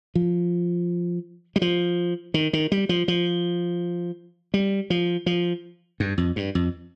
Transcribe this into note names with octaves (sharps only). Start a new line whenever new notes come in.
F3
G3
F3
D#3
D#3
G3
F3
F3
G3
F3
F3
G2
F2
G2
F2